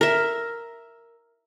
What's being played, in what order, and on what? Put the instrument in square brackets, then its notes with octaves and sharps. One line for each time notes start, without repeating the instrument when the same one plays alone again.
[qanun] A#4 E5